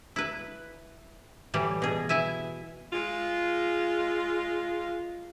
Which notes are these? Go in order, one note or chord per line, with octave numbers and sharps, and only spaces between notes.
E4 B4
A2 E3 G3
B2 G#4
E4 E5 G#5
G#3 F4